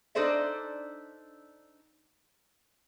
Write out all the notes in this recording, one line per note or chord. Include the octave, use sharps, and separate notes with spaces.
D4 D#4 A4 C5 D5 E5